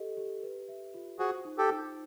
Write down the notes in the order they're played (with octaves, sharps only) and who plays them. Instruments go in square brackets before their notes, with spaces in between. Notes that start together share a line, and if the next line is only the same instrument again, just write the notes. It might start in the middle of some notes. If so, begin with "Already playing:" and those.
Already playing: [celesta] G4 A4 D#5
G4
B4
E5
F4
[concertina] F#4 G#4 [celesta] C5
[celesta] D#4
[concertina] G4 A4
[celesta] D#4